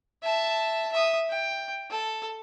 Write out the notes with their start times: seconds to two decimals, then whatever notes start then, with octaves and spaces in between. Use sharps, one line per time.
0.23 E5 A5
0.93 E5 D#6
1.30 G5
1.91 A4